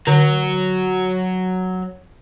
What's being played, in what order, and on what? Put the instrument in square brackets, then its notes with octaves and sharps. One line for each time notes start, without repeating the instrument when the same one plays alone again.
[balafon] D3 [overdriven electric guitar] F#3